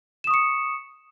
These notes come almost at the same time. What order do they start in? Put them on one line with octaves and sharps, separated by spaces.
E7 D#6 C#6 C#7